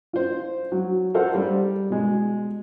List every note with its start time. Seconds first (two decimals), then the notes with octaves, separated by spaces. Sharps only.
0.13 F4 C5
0.72 F#3
1.14 F4 A4 A#4 C5 F5 F#5
1.35 G3
1.90 B2 G#3